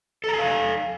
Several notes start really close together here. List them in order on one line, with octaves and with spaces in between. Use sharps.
A4 A#5 G#5 F5